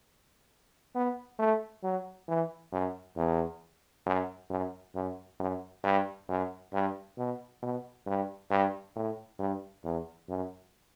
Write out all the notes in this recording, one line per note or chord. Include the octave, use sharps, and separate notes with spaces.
B3
A3
F#3
E3
F#2
E2
F#2
F#2
F#2
F#2
G2
F#2
G2
B2
B2
G2
G2
A2
G2
E2
F#2